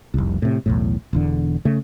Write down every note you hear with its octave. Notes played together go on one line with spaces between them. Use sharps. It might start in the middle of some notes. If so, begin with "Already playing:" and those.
F1 C2
A2 C3
B1 E2 A2
E1 E2 D3
C#3 A3